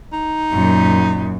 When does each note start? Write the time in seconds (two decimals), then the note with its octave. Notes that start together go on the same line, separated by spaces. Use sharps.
0.13 D#4
0.52 F#2 A#2